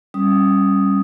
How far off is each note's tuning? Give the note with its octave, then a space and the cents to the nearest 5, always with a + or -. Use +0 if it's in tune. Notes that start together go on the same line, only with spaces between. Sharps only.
G3 +0 C#4 -15 D#6 +0